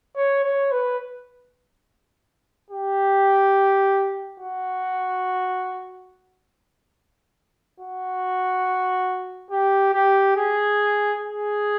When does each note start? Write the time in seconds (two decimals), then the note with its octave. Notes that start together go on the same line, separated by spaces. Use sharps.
0.16 C#5
0.44 C#5
0.72 B4
2.70 G4
4.40 F#4
7.80 F#4
9.51 G4
9.94 G4
10.36 G#4
11.20 G#4